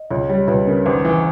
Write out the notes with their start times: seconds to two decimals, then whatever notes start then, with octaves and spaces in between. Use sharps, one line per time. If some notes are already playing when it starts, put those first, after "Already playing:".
Already playing: D#5
0.10 C#2 C#5
0.29 G3 C#5
0.48 C#2 B4
0.67 C#3 A#4
0.86 G#1 B4
1.05 E3